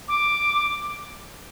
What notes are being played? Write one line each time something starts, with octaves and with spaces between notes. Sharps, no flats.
D6